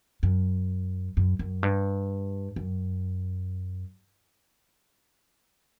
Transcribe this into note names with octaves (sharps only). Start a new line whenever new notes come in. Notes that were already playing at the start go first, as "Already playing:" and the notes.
F#2
F#2
F#2
G2
F#2